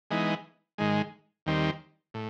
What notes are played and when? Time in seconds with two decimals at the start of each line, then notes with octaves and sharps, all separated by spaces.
0.11 E3 G#3 B3 D#4
0.78 G#2 D#3 G#3
1.46 D#2 D#3 G3 C4
2.14 A2